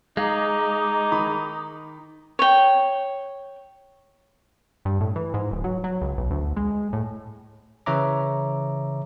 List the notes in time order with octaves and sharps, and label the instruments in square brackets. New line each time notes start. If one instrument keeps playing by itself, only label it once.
[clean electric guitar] G#3 [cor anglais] D#4 [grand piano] F5 [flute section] A#5 D6 D#6
[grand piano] D#3 B5
[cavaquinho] C#5 G5
[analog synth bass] G2
A2
E3
G#2
D1
F#3
F#3
C#2
B1
D2
G#3
A2
[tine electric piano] C#3 E3 C#5 E5 A#5 D6